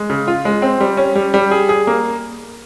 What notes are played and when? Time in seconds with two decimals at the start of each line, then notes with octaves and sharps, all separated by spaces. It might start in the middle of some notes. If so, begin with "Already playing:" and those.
Already playing: G#3
0.10 C#3
0.28 F4
0.45 G#3
0.62 C4
0.80 G3
0.97 C#4
1.15 G3
1.34 G3
1.51 G#4
1.69 G#4
1.87 A#3